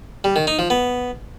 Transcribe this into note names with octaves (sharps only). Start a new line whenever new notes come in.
G3
D#3
D#4
F3
B3